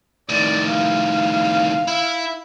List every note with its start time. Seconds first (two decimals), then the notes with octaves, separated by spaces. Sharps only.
0.29 A2 D#3 D5
0.69 F5
1.88 E4